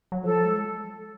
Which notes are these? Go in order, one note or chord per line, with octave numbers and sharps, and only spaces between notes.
F#3
F3 A4
G#3